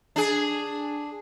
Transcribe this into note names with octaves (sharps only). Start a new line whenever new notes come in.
D4 G#4